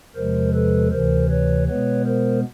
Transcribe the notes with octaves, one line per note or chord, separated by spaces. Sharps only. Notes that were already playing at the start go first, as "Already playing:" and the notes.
E2 C3 F3 G#3 A#4 C5
A4 B4
D2 C3 E3 A#4 C5
B4 C#5
B2 G#3 B3 B4 C#5
A#4 C5